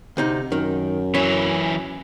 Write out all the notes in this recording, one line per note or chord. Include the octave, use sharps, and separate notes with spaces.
D2 C3 D#4
F#2 D#3
E3 F#3 C#4